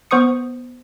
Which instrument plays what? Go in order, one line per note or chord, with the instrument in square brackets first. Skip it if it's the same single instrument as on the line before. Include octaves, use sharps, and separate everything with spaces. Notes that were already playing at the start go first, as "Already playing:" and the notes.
[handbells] B3 C5 C#6 D#6 C#7